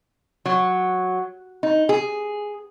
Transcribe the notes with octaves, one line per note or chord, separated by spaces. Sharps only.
F#3
D#4
G#4